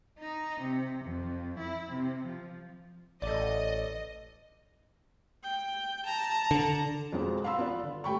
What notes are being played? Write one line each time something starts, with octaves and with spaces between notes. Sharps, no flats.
D#4
C3
F2
E4
C3
F3
A1 A4 D5 D#5
G5
A5 A#5
D3
F2 B2 F3 G#3 B3 C4
F5 B5 C6 E6
B3 F4 D5
D3
G3 A3 G5 B5 C#6